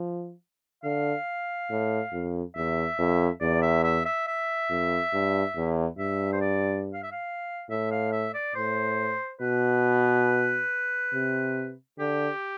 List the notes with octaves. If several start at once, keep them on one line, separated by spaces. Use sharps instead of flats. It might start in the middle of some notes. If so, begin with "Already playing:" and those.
Already playing: F3
D3 F5
A2
F2
E2 E5
F2
E2 D5
E5
E5
E5
E5
F2
G2
E2
G2 E5
C5
D5
F5
E5
F5
A2 E5
F5
E5
D5
A2 C5
B2 B4
C3
D3 G4